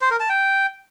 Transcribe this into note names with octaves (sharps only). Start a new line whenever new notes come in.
C5
A#4
A5
G5